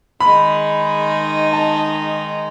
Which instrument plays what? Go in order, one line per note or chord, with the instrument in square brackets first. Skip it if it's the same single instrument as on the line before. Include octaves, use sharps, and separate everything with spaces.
[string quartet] D#3 G#3 D#4 [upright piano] B5
[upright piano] A5